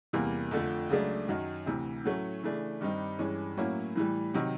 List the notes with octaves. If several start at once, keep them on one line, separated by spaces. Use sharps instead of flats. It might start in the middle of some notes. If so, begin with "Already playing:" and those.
E2 C3 E3 G3 A#3
F2 D3 F3 A3
C#2 C#3 F#3 A3 D4
F#2 D#3 F#3
D2 C3 E3
A2 F#3 A3 C#4
C#3 E3 A3 D4
G2 D#3 G3 C4 D#4
G2 E3 G#3 C#4
A2 F#3 A#3 C#4 E4
A2 E3 G3
C3 D#3 F#3